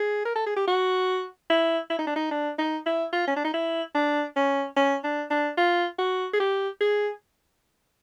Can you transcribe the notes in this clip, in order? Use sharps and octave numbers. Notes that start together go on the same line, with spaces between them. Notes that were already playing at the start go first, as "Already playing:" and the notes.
Already playing: G#4
A#4
A4
G#4
G4
F#4
E4
E4
D#4
D4
D#4
D4
D#4
E4
F4
C#4
D4
D#4
E4
D4
C#4
C#4
D4
D4
F4
F#4
G#4
G4
G#4